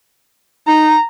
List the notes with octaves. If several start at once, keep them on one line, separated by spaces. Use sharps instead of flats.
D#4 A#5